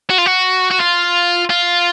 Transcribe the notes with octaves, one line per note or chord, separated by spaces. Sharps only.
F#4
F4
F#4
F#4
F4
F4